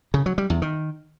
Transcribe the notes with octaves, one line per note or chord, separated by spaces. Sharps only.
C#3
F#3
G3
E2
D#3